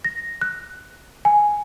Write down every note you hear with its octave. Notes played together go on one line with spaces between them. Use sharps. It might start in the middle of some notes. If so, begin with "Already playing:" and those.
A#6
F#6
G#5